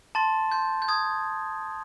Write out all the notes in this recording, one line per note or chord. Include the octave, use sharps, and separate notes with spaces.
A5 C6 A6
C6 G6
G6
D#6 G#6